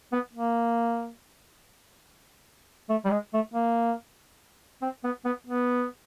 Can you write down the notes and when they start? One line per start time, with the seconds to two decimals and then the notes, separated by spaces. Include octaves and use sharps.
0.13 B3
0.33 A#3
2.90 A3
3.05 G3
3.11 G#3
3.34 A3
3.54 A#3
4.82 C4
5.04 B3
5.25 B3
5.47 B3